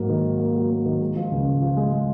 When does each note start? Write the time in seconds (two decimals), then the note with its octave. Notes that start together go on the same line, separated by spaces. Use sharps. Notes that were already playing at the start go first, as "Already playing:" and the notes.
Already playing: G#2 F#3 A#3
0.09 D#3
0.24 F#3
0.39 A#3
0.55 F#3
0.70 A#3
0.86 D#3
1.00 G#3
1.16 F3
1.31 C#2
1.46 C#2
1.62 F3
1.77 G#3
1.92 G#3